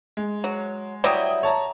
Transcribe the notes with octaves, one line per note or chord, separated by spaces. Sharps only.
G#3
F#3
F#3 G3 E4 G5 D#6
C#5 A5 A#5